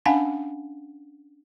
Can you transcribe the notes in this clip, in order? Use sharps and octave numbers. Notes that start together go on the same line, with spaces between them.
C#4 D4 F5 F#5 G#5 A5